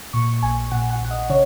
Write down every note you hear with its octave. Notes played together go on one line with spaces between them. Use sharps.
A#2 C#6
A#1 G#5
A#2 F#5
F#5
A#1 F#5
D#5
C#3 C#5